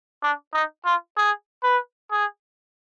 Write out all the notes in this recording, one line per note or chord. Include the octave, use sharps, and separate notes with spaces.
D4
D#4
F4
G#4
B4
G#4